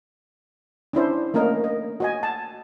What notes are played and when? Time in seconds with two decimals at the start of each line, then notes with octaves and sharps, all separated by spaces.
0.93 C#4 D4 E4 C5
1.34 A3 A#3 C#4 A#4 D#5
1.64 D#5
2.00 F#4 D#5 G#5
2.23 A5